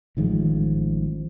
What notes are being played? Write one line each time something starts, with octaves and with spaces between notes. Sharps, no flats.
A1 D#3 F3 G#3